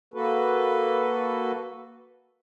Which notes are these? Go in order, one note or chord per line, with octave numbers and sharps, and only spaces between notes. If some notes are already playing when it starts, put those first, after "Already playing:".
A#3 F#4 A4 B4